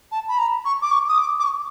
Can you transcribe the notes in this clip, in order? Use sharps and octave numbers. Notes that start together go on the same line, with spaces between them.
A5
B5
A#5
C#6
D6
C#6
D#6
D6
D6
C#6